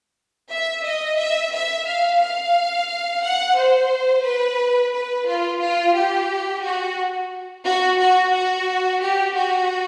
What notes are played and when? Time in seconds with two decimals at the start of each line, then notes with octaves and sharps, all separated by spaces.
0.50 E5
0.84 D#5
1.18 E5
1.52 E5
1.86 F5
2.20 F5
3.22 F#5
3.57 C5
4.24 B4
4.92 B4
5.26 F4
5.60 F4
5.94 G4
6.62 F#4
7.64 F#4
7.99 F#4
8.33 F#4
9.00 G4
9.34 F#4